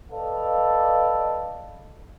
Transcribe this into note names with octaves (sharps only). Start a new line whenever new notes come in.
A4 B4 D5 D#5 F5